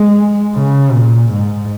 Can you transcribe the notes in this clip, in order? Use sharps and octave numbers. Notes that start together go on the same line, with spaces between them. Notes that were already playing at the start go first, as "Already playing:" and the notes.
Already playing: G#3
C#3
A#2
G#2